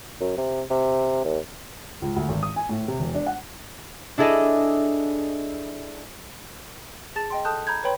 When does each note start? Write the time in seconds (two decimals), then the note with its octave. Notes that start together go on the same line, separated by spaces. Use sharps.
0.21 F#2
0.37 C3
0.70 C3
1.25 D#2
2.02 C#2
2.16 D2
2.29 G#1
2.43 D#6
2.56 G#5
2.69 A2
2.88 C3
3.00 E1
3.14 D4
3.27 F#5
4.18 D4 E4 G#4 A4 D#5
7.16 G#4 A5 A6 E7
7.30 D#5 G5 C6
7.45 A4 A5 D#6 F#6 G6
7.67 A#5 B5 G6 G#6
7.84 B4 C#5 G5 B5 C6